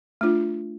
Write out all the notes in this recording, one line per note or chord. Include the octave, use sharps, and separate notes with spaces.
A3 D4 F4